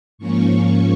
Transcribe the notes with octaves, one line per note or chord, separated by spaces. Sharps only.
G#2 F3 A#3 C#4 C#6